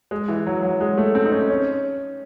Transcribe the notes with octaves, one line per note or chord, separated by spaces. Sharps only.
G#3
E3
F#3
F#3
G#3
A3
C4
D#4
C#4
C#4